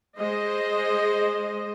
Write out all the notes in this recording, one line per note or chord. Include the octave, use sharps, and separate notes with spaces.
G#3 C5 D#5